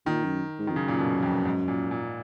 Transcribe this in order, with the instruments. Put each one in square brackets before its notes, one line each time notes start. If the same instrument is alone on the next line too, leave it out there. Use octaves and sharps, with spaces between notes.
[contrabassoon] A#2 [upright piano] D#3
[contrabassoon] F#2
G#2
[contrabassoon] F2 [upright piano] D#3
[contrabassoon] F#2 [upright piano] C#3
[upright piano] A#2
B2
F2
G#2
A#2
A#2